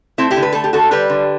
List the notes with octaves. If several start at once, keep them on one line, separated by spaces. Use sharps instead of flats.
A3 C4 E4
E4 G4
D3
B4
A3 A4
G4
D3 F#4 A4
G3 G4 B4
D3